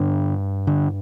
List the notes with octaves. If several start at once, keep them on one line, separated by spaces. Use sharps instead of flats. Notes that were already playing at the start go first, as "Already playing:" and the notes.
Already playing: G2 D3
D3